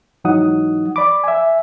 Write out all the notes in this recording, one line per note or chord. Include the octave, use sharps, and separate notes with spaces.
G#2 E3 F#3 D#4 F#5 D#6
D5 B5 D6
E5 G#5